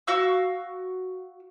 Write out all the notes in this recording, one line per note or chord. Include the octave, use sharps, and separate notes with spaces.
F#4 F5 C#6 E6